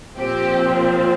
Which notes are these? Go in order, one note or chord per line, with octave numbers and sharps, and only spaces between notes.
A#2 F3 C4 G4